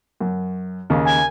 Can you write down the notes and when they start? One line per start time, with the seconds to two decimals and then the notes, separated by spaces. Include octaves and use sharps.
0.21 F#2
0.90 D#2 C#3
1.05 G#5